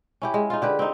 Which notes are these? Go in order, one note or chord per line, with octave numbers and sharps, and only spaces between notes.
C#4 E4 G4
G#3
D#4 F4
D3 G4 B4
C4 D#4